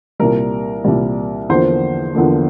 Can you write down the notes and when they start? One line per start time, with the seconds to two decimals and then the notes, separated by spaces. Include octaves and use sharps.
0.19 C2 A#2 G3 A#4
0.84 C2 A#2 G3
1.49 E2 D3 F3 A#3 C5
2.15 E2 D3 F3 A#3